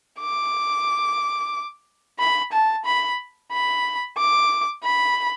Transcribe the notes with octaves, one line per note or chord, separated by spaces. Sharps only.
D6
B5
A5
B5
B5
D6
B5